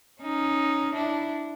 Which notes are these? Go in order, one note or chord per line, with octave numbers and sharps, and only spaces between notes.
C#4 D#4
D4 E4